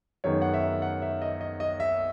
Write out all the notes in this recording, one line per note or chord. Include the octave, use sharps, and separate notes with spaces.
F#2 D#3 G#3 B3 D#4 C#5
F#5
E5
F#5
E5
D#5
D#5
D#5
E5